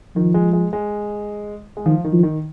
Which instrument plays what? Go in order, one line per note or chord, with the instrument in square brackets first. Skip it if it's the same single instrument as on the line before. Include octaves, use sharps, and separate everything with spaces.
[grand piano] D#3 [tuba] F3
[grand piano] G#3
G#3
G#3
G#3
[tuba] D#3 [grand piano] F3
[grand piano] D#3
[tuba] F3
[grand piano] D#3